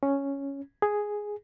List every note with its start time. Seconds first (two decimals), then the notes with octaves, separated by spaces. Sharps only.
0.03 C#4
0.82 G#4